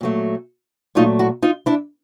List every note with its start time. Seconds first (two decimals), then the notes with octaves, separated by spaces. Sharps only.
0.01 A#2 F#3 A3
0.95 A#2 F#3 A3 D#4 F4
1.19 E4 F#4
1.42 D#4 F4
1.66 D4 E4